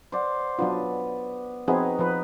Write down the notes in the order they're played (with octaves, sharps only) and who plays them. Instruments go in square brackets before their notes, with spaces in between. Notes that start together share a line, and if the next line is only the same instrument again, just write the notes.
[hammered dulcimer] C5 D5 F#5
[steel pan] F#3 D4 F4 [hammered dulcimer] B3
[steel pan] F3 C4 G#4 [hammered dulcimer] B3 D#4 F#4
[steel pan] F3 B4